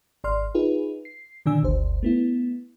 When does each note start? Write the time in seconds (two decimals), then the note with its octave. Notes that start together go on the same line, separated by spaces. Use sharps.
0.24 G#1 D5 C6 F6
0.55 D#4 F4 G#4 B4
1.05 C7
1.46 A#2 D3 D#3 D4 G#5 E6
1.63 G1 D2 C5
2.03 A3 B3 E4